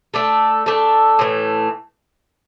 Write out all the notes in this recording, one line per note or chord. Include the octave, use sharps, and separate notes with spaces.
A3 D4 A4
A3 D4 A4
A2 E3 A3